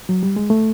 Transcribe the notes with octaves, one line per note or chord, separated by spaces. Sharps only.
F#3
G3
G#3
A3